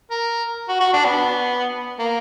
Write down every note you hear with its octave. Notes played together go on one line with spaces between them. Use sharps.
A#4
F#4
F#4
D4
B3
A#3